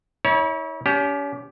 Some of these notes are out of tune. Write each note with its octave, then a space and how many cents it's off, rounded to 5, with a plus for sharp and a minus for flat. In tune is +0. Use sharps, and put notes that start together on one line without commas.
E4 -40 C#5 +15
C#4 +40 G4 +0